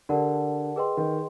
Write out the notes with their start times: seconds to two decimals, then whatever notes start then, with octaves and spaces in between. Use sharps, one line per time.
0.09 D3 G4 A#4 D5 F#5 A5
0.76 G#4 B4 D#5 G5 C6
0.97 D#3